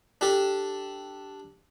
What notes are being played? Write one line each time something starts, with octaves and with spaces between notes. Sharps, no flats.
D4 G4 A4